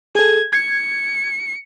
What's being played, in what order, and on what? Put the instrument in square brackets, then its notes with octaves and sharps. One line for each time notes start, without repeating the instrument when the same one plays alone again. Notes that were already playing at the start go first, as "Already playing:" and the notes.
[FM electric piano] G#4 A4 [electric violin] G#6
[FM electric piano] G#6 [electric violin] C#7